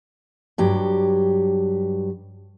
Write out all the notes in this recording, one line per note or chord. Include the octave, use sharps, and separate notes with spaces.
G2 F#3 G4